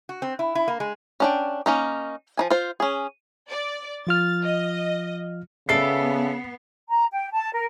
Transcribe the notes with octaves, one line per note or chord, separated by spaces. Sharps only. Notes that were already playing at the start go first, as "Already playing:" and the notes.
F#4
C4
E4
E4
A#3
G#3
C#4 D4 G5
A#3 C#4 D#4
F3 D#4 G#5
F4 C5
C#4 G#4
D5
F3 F4 F6 A6
D#5
C#3 B3 A4 D5 E5 C7
A#5
G5
A5
A#4